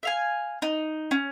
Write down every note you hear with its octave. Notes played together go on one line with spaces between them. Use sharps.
E5 F5 G#5
D#4
C#4